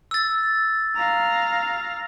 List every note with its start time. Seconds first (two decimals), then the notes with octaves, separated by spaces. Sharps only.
0.11 E6 A6
0.96 F5 A#5